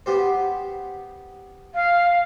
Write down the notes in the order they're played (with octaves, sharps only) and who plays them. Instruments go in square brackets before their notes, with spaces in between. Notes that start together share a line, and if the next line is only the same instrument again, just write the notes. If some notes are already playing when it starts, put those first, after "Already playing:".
[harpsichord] B3 G4 C5
[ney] F5